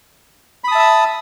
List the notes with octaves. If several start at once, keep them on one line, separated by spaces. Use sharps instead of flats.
E5 A5 B5 D#6 E6